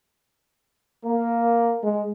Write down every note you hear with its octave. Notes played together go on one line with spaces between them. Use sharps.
A#3
G#3